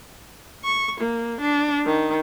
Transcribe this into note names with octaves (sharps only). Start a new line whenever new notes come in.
C#6
A#3
D4
D#3